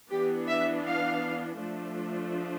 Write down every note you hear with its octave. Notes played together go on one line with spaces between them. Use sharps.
E3 B3 D4 G4
E5
F5
F3 A3 D4